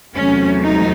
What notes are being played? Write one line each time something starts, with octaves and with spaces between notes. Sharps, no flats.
E2 C3 F#3 A3 C#4
D#4